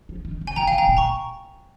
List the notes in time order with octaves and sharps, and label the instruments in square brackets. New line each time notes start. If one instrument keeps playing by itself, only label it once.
[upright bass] F3
D#3
C3
[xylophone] G#5
[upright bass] A#2 [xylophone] G5 A#5
[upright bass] A#2 [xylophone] F5 G#5
[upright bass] C3 [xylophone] G5 A#5
[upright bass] A#2
[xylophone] A#5 C#6